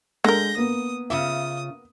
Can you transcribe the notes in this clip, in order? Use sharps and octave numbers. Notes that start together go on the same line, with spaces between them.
D3 G#3 A#4 G6 A#6
A#3 B3 D#6
C#3 F4 E5 D#6